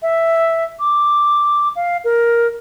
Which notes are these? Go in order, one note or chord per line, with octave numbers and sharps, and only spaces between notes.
E5
D6
F5
A#4